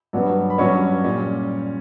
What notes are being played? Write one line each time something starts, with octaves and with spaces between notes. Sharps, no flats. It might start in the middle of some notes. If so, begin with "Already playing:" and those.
G2 F#3 B3
B5
G2 F#3 C#4 C#5 C#6
A#2 G3 C#4